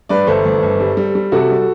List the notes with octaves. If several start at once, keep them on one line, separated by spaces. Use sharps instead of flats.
G2 B4 D5
G1 A4 C5
G1
G1
G3
G3
G3
C3 F#4 A4
G3